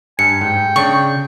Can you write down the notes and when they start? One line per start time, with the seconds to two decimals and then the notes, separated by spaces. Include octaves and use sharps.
0.19 G2 G#5 C#7
0.41 G#2 G5
0.76 C#3 D4 C#6